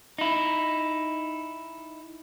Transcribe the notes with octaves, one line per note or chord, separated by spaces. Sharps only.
D#4 E4